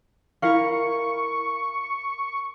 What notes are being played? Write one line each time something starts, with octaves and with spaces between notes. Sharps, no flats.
E4 A#4 F5 C#6